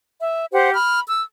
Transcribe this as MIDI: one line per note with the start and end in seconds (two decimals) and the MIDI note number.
0.20 0.45 76
0.52 0.73 67
0.52 0.73 72
0.52 0.73 78
0.74 1.00 83
0.74 1.00 89
1.07 1.22 88